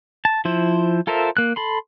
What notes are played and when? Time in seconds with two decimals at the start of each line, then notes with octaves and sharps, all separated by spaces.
0.25 A5
0.45 F3 E4 C5
1.07 F4 A4 A#4 C5 E5
1.37 A#3 F#6
1.56 A4 B5 C6